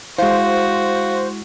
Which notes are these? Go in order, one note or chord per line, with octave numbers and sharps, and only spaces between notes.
G#3 E4 F#4 C5 F5